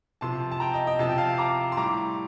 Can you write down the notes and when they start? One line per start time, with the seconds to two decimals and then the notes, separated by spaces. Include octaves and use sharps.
0.21 C3 F3 A5 C6
0.51 A5
0.60 G5 A#5
0.74 D#5 G5
0.87 D#5 G5
0.99 C3 F3 A5
1.09 G5
1.18 F5 A5
1.38 A#5 D6
1.72 C6
1.77 A2 G3 A#5 D6